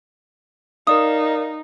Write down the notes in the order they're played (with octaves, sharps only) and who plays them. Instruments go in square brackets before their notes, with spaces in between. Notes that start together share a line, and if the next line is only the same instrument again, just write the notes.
[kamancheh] D#4 [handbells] A#4 D5 F5 [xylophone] D#6